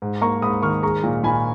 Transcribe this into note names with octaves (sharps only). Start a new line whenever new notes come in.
G#2
A#3 A#5 C#6
G#2 B5 D#6
D#3 C#6 F6
G#3 A#5 C#6
A#2
A#2 G#5 B5